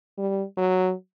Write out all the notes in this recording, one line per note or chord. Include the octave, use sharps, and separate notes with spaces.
G3
F#3